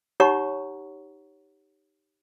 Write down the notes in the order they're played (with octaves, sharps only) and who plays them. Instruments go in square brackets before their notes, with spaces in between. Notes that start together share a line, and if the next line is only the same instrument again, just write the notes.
[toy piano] D#4 G4 C#5 F#5 A#5 C#6